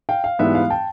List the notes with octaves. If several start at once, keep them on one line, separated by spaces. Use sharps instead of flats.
F5 G5
F5
G#2 E3 G3 B3 E5
F5
G5 A5